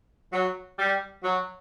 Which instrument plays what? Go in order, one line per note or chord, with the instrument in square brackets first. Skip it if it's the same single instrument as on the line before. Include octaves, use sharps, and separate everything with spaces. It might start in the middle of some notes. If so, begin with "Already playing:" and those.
[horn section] F#3
G3
F#3